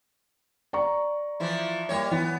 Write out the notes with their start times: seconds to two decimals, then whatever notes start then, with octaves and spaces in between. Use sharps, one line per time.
0.73 D5 A#5 C#6
1.40 E3 F3 E4
1.89 G3 A#3 C#5
2.11 E3 B3